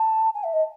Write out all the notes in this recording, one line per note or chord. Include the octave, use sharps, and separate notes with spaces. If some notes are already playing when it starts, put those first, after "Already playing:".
Already playing: A5
G#5
E5
D#5